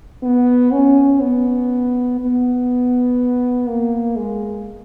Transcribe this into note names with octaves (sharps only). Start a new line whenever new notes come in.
B3
C#4
B3
B3
A#3
G#3